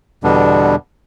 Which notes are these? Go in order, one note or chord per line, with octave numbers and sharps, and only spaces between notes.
E2 B2 D3 G3 B3 D4